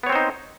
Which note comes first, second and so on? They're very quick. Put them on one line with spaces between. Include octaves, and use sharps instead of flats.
B3 C#5 C4 C5 D#4